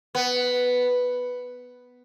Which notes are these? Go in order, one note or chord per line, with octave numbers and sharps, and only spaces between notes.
B3